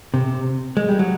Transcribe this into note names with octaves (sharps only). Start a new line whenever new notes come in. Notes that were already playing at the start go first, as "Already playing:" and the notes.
C3
G#3
G3
F#3